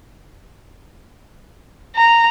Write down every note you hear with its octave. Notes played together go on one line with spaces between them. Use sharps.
A#5